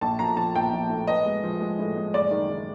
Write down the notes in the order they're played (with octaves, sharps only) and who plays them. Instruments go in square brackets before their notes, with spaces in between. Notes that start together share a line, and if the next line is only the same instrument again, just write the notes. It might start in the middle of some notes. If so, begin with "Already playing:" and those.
[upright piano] A#1 A5
F3 A#5
F3 A5
A#1 G5
A#1
A2
B3 D#5
G#3
F3
G#3
A2
G#3
F#1 D5
D#3
D#3